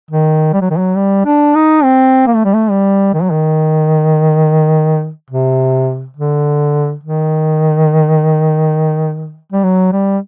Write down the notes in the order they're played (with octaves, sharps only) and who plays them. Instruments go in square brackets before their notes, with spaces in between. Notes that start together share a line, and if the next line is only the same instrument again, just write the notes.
[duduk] D#3
G3
F#3
D#3
F#3
G3
D4
D#4
C4
A#3
A3
G3
A3
G3
D#3
F#3
D#3
C3
D3
D#3
G3
F#3
G3